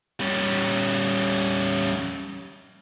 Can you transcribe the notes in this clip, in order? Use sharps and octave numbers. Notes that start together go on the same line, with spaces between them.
G3 C#4